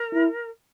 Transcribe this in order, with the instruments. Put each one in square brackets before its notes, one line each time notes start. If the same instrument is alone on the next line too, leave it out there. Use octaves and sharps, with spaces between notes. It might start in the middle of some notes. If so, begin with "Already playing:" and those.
Already playing: [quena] A#4
[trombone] E4